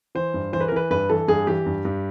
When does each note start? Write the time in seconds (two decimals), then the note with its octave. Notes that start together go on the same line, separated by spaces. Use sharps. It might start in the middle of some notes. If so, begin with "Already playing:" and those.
0.15 E3 C5
0.34 G2
0.53 E3 C5
0.60 B4
0.68 A#4
0.72 E3 B4
0.90 G2 B4
1.10 E3 A4
1.28 G2 G#4
1.47 E3 G4
1.66 G2
1.85 G2